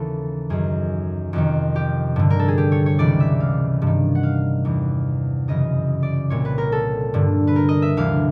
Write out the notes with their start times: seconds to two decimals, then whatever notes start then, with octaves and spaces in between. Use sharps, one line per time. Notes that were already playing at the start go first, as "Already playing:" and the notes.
Already playing: D#2 C#3 E3 A4
0.50 F#2 D#3 G#4
1.33 F2 C3 D#3
1.76 G4
2.16 G2 D3
2.30 A#4
2.39 A4
2.48 G#4
2.58 G4
2.72 C#5
2.86 C#5
2.99 C#2 C3 E3 D5
3.20 E5
3.40 F5
3.82 G2 D#3
4.15 F#5
4.23 F5
4.65 E2 C3 E3
5.48 F#2 C#3 E3 D#5
6.03 D5
6.30 C2 A#2 C#5
6.45 B4
6.58 A#4
6.72 A4
7.14 G2 D3
7.47 B4
7.56 A#4
7.69 D#5
7.82 E5
7.97 D2 C3 E3 F5